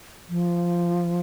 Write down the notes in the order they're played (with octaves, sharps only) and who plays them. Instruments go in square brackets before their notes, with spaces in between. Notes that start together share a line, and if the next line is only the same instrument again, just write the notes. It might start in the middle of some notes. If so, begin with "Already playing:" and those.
[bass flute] F3